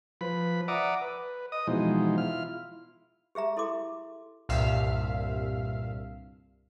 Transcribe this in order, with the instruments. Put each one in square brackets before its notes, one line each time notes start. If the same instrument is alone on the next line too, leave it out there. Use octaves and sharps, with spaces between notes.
[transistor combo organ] F3 B4 B5
D5 E5 F#5 A#5 D6 D#6
B4
D#5 D#6
B2 E3 F3 G#3 D#4 C5
E4 F4 F6
[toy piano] G4 G#4 E5 A#5
E4 A4 C6 D6
[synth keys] C2 G2 A#2 E5 F5